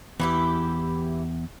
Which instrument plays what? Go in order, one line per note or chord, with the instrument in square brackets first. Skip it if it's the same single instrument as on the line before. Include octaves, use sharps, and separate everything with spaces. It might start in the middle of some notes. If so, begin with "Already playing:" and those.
[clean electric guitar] E2 [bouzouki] E3 E4 G4